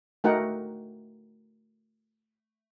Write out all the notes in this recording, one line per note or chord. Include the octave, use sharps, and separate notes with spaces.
A3 D#4 F#4 A#4 F#5 G5